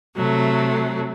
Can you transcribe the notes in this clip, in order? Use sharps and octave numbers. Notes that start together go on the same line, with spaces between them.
C3 F#3 A3